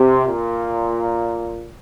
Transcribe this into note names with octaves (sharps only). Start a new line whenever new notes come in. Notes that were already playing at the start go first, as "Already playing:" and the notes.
Already playing: C3
A#2